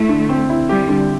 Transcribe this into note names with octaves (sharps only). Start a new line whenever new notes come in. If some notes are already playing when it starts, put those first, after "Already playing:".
Already playing: A3 E4
D3
C4
E4
G3 G4
D3